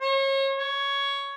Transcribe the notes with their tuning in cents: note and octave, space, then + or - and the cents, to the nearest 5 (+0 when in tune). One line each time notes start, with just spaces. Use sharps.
C#5 -35
C#5 +10